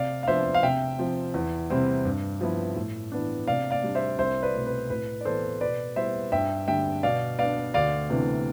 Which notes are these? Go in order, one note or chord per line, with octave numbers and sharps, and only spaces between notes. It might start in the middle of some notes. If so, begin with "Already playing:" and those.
Already playing: C3 D5 F5
F5
F3 B3 D4 C5 E5
F5
C3 E5 G5
F3 C4
E2
C3 G3 C4 E4
G2
F3 B3 E4
A2
E3 B3 D4
C3 D5 F5
D5 F5
G3 D4
C5 E5
C2 C5 E5
B4 D5
B2 A3 C4
B4
A2 B4
D5
E3 B3 A4 C5
B2 B4 D5
G3 B3 E4 C5 E5
G2 E5 G5
D3 G3 D4 E5 G5
B2 D5 F5
B3 D4 D5 F5
D2 D5 F5
C3 E3 B3 D4